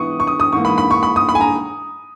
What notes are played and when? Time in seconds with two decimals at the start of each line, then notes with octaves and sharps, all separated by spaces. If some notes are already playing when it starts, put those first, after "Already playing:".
Already playing: G#2 E3 B3 E4 C#6 D#6
0.20 C#6
0.27 D#6
0.40 D#6
0.52 G#2 E3 A#3 C#6
0.65 B5
0.78 B5
0.91 C#6
1.03 B5
1.16 D#6
1.29 B5
1.35 G#5
1.41 A#5